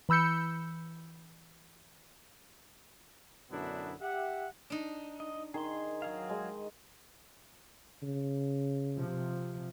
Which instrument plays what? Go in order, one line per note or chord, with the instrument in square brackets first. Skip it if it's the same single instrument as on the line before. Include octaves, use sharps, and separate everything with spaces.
[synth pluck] E3 B5 E6 G6 C#7
[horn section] F#2 B2 D3 B3 D4 E4
G4 E5 F#5
[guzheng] D4 D#4
[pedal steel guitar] D#5
[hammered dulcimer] D#3 [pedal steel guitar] G#4 C6
[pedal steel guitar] F#3 G#4 F5
[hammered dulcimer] G#3 D#5
[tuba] C#3
[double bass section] C3 F3